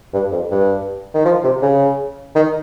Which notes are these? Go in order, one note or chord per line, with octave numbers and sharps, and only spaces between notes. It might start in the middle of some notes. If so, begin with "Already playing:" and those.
G2
F2
G2
D#3
F3
C3
C#3
D#3